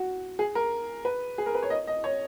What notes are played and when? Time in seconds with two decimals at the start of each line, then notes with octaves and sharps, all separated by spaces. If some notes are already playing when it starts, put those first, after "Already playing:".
Already playing: F#4
0.39 G#4
0.55 A#4
1.05 B4
1.38 G#4
1.46 A#4
1.55 B4
1.63 C#5
1.70 D#5
1.87 D#5
2.04 C#5